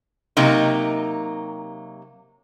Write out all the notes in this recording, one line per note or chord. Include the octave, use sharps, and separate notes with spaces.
C3 F#3 A#3 D#4